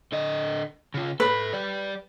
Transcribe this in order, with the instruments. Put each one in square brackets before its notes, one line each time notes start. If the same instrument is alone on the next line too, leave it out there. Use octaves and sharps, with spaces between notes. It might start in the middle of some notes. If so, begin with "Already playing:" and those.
[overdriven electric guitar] D3 D#5
C#3 F4
[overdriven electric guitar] A4 B5 [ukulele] B4
[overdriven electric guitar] G3 D5